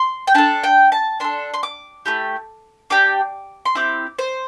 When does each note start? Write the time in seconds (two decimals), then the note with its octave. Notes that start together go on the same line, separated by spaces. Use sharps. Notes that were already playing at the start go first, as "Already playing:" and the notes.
Already playing: C6
0.27 G5
0.35 D4 A4 A5
0.64 G5
0.92 A5
1.20 D4 A4 C6
1.54 C6
1.63 D6
2.06 A3 E4 G4
2.90 D4 G4 D6
3.65 C6
3.75 C4 E4 G4 D6
4.19 C5